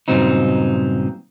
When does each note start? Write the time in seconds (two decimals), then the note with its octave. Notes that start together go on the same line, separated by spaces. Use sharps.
0.08 G2 A#2 C#3 F#3 C4 D#4